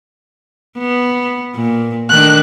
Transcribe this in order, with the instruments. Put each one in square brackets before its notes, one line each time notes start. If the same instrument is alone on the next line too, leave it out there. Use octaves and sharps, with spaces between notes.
[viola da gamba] B3
A#2
[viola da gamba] D#3 A3 D4 [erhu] F#6